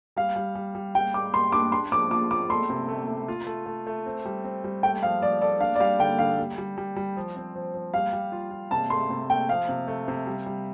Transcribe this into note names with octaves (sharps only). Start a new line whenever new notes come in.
G3 F5
G3
G3
G3
G3 G5
G4 D6
G4 C6
D4 D6
D4 C6
F3 D6
F4 D6
F4 D6
A4 C6
C3
A3
A3
F4
A3
A3
A3
C4
G3
C4
G3
A3 G5
F3 F5
F3 D5
A4 D5
D4 F5
D5
G3 F5
D3 G5
D3 F5
G3
G3
G3
G3
F3
C4
F3
F3
G3 F5
G3
F4
F4
C3 A5
A3 C6
C3
A3 G5
F3 F5
C3
A3
C3
G3
G3